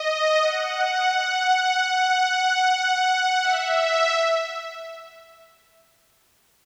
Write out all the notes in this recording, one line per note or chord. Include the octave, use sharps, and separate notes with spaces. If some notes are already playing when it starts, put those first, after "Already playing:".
Already playing: D#5
F#5
F#5
F#5
E5